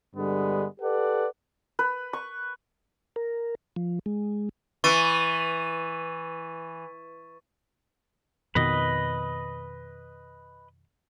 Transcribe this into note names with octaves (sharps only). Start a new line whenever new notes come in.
G2 D3 G3 G#3 B3
G4 A4 B4 D5 F#5
B4
C#6
A#4
F3
G#3
E3 C#6 A6 D#7
F2 B2 D#3 B4 D#5